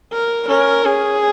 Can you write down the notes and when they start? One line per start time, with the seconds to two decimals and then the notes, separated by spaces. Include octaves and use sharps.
0.13 A#4
0.49 C#4 A#4
0.85 C#4 G#4